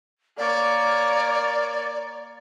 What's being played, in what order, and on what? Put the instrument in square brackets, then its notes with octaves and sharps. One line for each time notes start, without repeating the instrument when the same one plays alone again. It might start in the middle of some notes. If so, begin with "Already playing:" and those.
[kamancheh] A#3 C#5 [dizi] D5